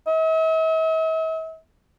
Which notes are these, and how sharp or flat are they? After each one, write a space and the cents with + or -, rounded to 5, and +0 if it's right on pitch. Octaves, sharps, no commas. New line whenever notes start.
E5 -45